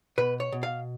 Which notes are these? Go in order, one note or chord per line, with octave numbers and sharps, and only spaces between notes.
B2 B4
C#5
B2
F5